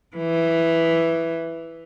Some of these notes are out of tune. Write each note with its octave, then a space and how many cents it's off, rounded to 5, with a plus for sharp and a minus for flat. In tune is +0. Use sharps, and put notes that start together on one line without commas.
E3 +5